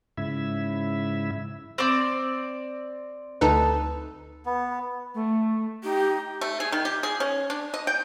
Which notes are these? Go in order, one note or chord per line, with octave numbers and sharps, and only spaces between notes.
G#2 C#3 E4 E5
C4 D5
D2 D#4 A4 B4
B3
A3
D#4 G4
A3
G#4
D#3
G4
G#4
C#4
D4
D#5
G5